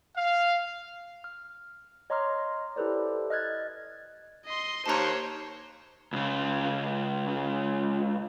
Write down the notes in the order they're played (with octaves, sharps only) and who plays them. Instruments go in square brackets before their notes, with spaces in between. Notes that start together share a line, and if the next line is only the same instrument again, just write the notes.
[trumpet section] F5
[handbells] F6
C#5 D#5 A#5 C6 D6 F6
E4 G4 A4 B4 C5 D5
D#5 F6 F#6 G#6 A6
[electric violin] D#5 C6
[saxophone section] D#2 [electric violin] C5 C#5 [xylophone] A5 A#5
[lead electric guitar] C#2 C#3